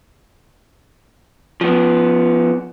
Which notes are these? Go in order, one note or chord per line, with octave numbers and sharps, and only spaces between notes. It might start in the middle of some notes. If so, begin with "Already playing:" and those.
F3 B3